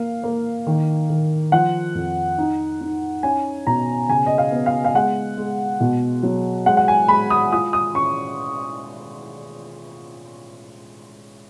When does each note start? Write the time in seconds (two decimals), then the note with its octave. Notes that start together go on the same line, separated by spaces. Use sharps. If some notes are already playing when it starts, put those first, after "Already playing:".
Already playing: A#3 F5
0.24 A#3
0.67 D#3
1.10 D#3
1.52 F3 F#5
1.95 F2
2.38 D#4
2.81 D#4
3.23 C#4 G#5
3.67 B2 A#5
4.09 C#3 G#5
4.26 D#5
4.38 F5
4.52 B3
4.66 F5
4.84 F5
4.95 G#3 F#5
5.38 G#3
5.80 B2
6.23 F#3
6.66 G#3 F#5
6.77 F#5
6.88 G#5
7.08 G#3 B5
7.30 D#6
7.52 F4 D#6
7.73 D#6
7.94 C#4 C#6